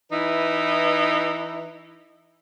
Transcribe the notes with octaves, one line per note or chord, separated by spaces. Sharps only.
E3 D#4 E4 B4 E5